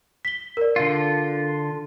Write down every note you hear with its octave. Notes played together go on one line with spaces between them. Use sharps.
B6 G7
A#4 D5
D3 F4